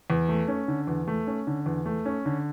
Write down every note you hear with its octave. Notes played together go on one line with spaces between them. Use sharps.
E2
A3
C#4
D3
E2
A3
C#4
D3
E2
A3
C#4
D3